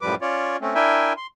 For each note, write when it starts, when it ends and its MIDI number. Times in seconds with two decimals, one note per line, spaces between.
0.01 0.15 42
0.01 0.15 45
0.01 0.15 53
0.01 0.15 55
0.01 0.15 71
0.01 0.15 86
0.22 0.57 61
0.22 0.57 65
0.22 0.57 73
0.22 0.57 74
0.61 0.74 57
0.61 0.74 60
0.61 0.74 61
0.75 1.13 62
0.75 1.13 64
0.75 1.13 70
0.75 1.13 76
0.75 1.13 79
0.75 1.13 80
1.17 1.27 84